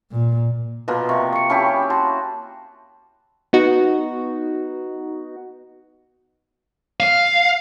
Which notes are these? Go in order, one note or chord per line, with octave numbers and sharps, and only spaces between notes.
A#2
B2 F3 A#3 B4
C3 C#6
C#6 C#7
C#4 E4 G4 A5 B5
F#4 A5 C6
B3 D#4 F#4
F5